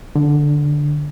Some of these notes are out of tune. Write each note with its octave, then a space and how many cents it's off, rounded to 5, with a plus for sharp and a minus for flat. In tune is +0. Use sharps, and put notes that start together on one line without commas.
D3 +0